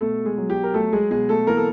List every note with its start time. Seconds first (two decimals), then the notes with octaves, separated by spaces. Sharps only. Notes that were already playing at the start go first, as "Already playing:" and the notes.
0.01 B2 A3 A4
0.25 G#3 G#4
0.37 F#3
0.50 G4
0.63 A#4
0.74 F#3 A3 A4
0.93 G#3 G#4
1.11 B2 G#3 G#4
1.29 A3 A4
1.47 E3 A#3 A#4
1.57 A4